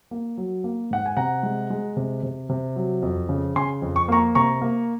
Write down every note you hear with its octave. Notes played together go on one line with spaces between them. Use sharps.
A#3
F#3
A#3
G#2 F#5
G#5
C3 F#5 A#5
G#3
G#3
C3
C3
C3
F#3
F2
C#3
C#3 G#5 C6
F2
C#6
A#3 A#5 C#6
C3 A#5 C#6
A#3